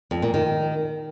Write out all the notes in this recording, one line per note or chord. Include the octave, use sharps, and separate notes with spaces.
F2
A#2
D#3